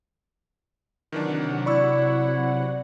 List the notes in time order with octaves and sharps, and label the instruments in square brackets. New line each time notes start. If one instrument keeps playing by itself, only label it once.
[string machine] C3 F#3 F#5 [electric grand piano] D#3 E3 D4
[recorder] E4 [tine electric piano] D5 [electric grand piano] B5 C#6 E6